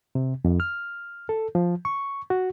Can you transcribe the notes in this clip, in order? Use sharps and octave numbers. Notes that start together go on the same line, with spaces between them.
C3
F2
F6
A4
F3
C#6
F#4